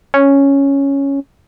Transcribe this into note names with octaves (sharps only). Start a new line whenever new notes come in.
C#4